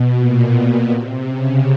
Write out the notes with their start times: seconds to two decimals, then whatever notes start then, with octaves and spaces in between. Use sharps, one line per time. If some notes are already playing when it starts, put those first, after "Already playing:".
Already playing: B2
0.17 A#2
0.90 C3
1.27 C#3